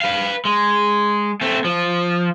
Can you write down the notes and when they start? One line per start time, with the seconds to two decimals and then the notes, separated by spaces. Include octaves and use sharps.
0.01 B4 F5
0.45 G#3
1.41 A3 C4
1.64 F3